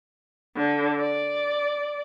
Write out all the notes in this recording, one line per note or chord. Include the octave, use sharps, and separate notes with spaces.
D3
D5